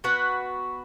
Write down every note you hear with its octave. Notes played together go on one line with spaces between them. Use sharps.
B3 F#4 B4